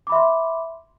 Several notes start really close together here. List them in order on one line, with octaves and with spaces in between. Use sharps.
D6 B5 E5 C6